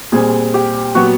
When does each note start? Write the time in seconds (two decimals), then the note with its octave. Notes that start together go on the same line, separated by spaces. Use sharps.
0.12 A#2 G3 C4 G#4
0.54 G4
0.95 A#2 F#3 B3 F#4